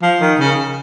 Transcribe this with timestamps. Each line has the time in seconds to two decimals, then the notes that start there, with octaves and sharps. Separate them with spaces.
0.02 F3
0.21 D#3
0.39 C#3